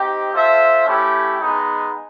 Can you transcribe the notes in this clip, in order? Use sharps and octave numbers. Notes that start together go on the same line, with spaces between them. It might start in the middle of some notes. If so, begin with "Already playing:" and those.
Already playing: C4 D#4 G4
F4 A4 C5 E5
A3 C#4 E4 G4
G#3 B3 D#4